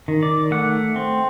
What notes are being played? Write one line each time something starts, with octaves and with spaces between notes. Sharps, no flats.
D#3
D5
A3 F#5
C4